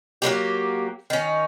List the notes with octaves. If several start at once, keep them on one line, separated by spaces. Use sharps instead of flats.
F#3 G3 A#3 G4
D#3 C#4